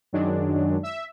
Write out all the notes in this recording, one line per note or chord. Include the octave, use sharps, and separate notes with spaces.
F#2 D#3 F#3 G#3 D4
E5